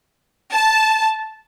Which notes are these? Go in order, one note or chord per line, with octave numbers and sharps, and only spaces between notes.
A5